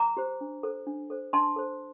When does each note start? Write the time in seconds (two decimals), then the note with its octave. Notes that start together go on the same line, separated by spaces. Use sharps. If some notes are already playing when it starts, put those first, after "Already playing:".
Already playing: A#5 D6
0.17 G4 C5
0.41 D4
0.63 A4 C5
0.87 D4
1.10 A4 C5
1.33 D4 A5 C6
1.56 A4 C5